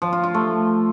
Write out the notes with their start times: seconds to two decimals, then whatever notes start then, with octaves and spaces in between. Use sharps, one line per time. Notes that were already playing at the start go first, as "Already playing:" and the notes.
0.02 F3
0.13 F4
0.24 F4
0.34 A3